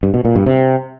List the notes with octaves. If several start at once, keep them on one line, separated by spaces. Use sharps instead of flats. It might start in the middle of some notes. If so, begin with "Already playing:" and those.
G2
B2
A#2
G2
C3